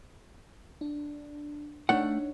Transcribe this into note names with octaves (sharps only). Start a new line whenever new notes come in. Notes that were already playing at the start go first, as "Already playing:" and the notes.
D4
A3 D4 D#4 C#5 F#5